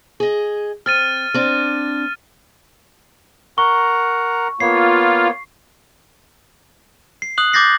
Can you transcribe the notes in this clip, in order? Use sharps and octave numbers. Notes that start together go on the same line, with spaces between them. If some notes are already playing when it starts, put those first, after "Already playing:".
G#4 D#5
C4 F6 A6 D#7
C4 D4
A#4 F#5 A#5 C#6
A#3 B3 F4 C#5 C7
C7
D#6 F#6 F#7
D6 G6 A6 A#6 C7